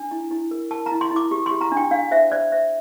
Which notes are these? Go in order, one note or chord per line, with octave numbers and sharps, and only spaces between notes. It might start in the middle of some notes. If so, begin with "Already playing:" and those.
Already playing: D4
E4
E4
A#4
A#4 A5
A#5
E4
C6
E4 D6
G4
C6
G4
A#5
D4
G5
D4 F5
C5 E5
C5 D5
C5 E5